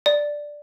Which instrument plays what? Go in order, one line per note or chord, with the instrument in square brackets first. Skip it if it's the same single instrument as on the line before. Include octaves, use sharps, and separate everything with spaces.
[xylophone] D5